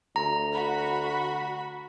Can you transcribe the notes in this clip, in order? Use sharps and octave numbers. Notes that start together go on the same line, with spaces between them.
D2 A#5
F#4 B5